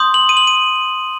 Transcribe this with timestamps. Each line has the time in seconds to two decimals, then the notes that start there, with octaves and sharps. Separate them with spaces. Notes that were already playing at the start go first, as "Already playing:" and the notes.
Already playing: C6 D#6 G6
0.14 F#7
0.29 D#7
0.37 F#7
0.47 D#7